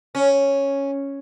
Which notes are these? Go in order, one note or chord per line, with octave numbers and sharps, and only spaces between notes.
C#4